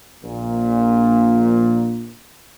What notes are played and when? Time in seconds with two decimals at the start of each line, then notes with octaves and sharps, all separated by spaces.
0.23 A#1 A#2